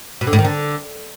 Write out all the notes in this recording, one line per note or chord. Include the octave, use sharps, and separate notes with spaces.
B2
D3
A2
D#3
D3